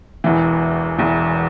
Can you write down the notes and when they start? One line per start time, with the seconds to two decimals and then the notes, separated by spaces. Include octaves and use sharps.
0.24 E1 E2 E3
0.98 E1 E2 E3